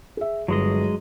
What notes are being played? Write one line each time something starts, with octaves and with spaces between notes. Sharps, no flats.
G#4 E5
G1 F#3 G#3 D#5